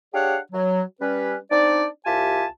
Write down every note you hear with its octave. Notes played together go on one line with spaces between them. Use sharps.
D4 G4 G#4 C#5 F5 F#5
F#3
G3 C#4 B4
C4 D4 D#4 D5
C2 F4 G4 E5 G#5 A5